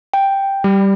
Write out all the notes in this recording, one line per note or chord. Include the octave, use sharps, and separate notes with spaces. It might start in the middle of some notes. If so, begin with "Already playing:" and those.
G5
G3